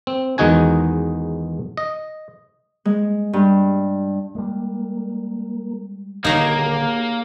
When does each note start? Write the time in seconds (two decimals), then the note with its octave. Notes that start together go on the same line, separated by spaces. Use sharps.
0.07 C4
0.38 E2 D#3 G#3 D#4 F#4 G#5
1.77 D#5
2.85 G#3
3.33 G2
4.35 G3 G#3 A#3
6.25 D#1 D3 A#3 D#4 G4 G#4 A#4 C#5